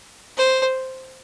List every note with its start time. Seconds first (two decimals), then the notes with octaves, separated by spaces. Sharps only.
0.38 C5